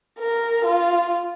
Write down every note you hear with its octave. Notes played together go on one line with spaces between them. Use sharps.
A#4
F4